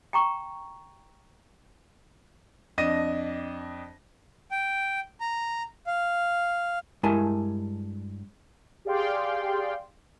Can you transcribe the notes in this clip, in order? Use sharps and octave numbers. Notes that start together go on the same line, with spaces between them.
G5 A#5 C#6
F2 D4 D#5 A#6 D#7
G5
A#5
F5
G2 G#3 E4 A#4 G#5 A5
G4 G#4 D5 F5 G5 C6